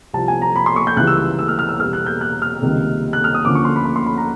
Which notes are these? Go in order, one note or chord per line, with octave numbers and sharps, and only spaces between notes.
C2 C3 F3 A5
G#5
A#5
B5
C6
C#6
G6
C#2 C#3 E3 G3 F#6
E6
E6
E6
F6
F6
E6
E2 B2 G3 F6
F#6
G6
F#6
F6
C#2 C3 D#3 G3 A#3
F#6
F6
D#6
D2 D3 F3 A#3 C#4 D6
C#6
C6
B5
C6
C6
B5
A#5